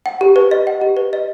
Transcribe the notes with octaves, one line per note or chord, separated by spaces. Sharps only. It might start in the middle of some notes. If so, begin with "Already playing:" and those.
F#5
G4
B4
D#5
F#5
G4
B4
D#5